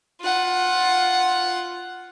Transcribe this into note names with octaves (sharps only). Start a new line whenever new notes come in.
F4 F#5